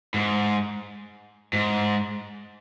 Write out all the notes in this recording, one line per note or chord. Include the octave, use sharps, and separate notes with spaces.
G#2
G#2